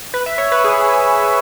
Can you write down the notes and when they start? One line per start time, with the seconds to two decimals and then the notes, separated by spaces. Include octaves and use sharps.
0.14 B4
0.26 E5
0.38 C#5
0.52 B4
0.64 G#4